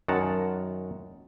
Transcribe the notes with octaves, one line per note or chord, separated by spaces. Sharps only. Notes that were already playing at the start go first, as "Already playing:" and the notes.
F#2 D#3 F#5 A5 A#5